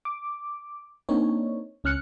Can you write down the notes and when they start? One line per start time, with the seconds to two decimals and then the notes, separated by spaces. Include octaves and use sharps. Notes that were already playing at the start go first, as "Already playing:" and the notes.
0.05 D6
1.09 A#3 C4 D4 D#4 C#5
1.84 C#2 C#4 F6 F#6 C#7